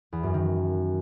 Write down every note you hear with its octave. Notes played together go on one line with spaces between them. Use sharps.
E2
F#2
D#3